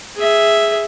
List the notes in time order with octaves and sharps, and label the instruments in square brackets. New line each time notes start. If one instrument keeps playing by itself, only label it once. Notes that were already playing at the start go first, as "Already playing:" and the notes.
[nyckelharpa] G#4 E5